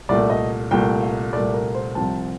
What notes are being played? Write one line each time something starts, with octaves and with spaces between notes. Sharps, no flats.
C2 A#2 A3 D5
D#5
C2 A#2 A3 G5
F5
C2 A#2 A3 D5
A#4
C5
C2 C3 F3 C4 A5